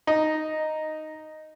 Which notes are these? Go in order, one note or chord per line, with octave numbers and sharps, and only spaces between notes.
D#4